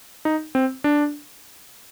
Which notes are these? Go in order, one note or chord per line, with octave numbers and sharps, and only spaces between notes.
D#4
C4
D4